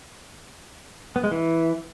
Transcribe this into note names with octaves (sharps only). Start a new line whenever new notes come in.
B3
G#3
E3